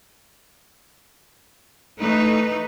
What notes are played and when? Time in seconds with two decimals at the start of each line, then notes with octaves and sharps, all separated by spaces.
2.00 E3 A3 D#4 B4